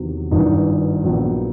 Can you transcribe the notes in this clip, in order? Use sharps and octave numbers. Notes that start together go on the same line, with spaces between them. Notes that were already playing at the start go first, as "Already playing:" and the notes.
Already playing: E2 C3 D#3 F#3
G#1 G2 E3 D#4
A#1 A#2 F#3 B3